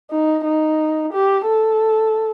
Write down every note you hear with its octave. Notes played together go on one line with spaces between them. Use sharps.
D#4
D#4
G4
A4